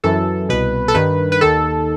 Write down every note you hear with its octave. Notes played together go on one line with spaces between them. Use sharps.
F#2 E3 A4
C2 B2 B4
A4
G2 D#3 B4
B4
D#2 D#3 A4